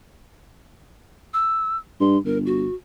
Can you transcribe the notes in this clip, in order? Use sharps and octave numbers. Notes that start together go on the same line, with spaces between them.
E6
G2 C6
G1 A#4
F#4